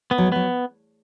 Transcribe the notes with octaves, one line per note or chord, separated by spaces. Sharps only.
B3
F#3
G#3
F#3 B3